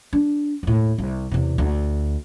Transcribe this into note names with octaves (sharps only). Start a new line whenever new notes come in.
D4
D#2 A2
C2
E2 C3
D2